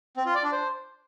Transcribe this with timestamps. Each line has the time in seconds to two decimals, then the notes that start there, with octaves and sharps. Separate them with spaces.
0.17 C4
0.26 F4
0.35 D5
0.43 D4
0.52 C5